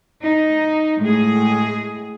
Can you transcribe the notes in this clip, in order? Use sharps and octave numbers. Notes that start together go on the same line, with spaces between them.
D#4
A2 G#3 G#4